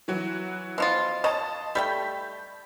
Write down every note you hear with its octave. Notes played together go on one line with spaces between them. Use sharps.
E3 F#3 F#4
B2 F3 F4
C#5 D#5 A5
G3 A3 G5 B5 G6 B6